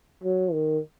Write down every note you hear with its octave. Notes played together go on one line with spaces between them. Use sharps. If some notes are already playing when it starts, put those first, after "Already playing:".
F#3
D#3